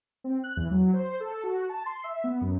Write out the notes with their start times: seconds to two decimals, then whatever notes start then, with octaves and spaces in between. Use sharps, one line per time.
0.24 C4
0.44 F#6
0.57 E2
0.71 F#3
0.94 C5
1.20 A4
1.44 F#4
1.69 A5
1.86 C6
2.04 E5
2.24 B3
2.41 F#2